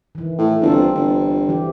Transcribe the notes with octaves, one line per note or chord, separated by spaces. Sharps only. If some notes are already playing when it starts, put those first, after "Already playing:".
D#3 E3
A2
G1 C4 F4 A4
G1
E3 F3 G4